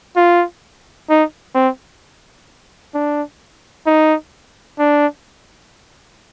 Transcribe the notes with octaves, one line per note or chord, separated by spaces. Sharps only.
F4
D#4
C4
D4
D#4
D4